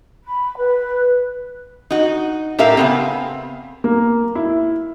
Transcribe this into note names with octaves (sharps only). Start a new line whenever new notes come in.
B5
B4
D#4 F#4
A2 G4 A#4 E5 F5
C#3 B3 C4
A#3
E4